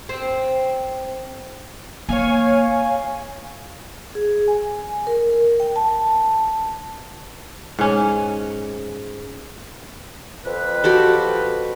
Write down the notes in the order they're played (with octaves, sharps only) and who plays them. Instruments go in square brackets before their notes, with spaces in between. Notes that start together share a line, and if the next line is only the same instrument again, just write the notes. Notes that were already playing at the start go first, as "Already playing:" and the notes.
[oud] C4
[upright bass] A#3 [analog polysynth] C#5 F5 G#5
[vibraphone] G#4
G#5
A#4
G5
A5
[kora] G#2 C#4
[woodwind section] F2 B4
[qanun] F#4 G4 A4